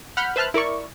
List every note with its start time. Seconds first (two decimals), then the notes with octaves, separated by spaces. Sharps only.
0.17 F#5 B5 F6 G6
0.36 B4 C5 E5 A5 F6 F#6
0.54 E4 A#4 D5 C#6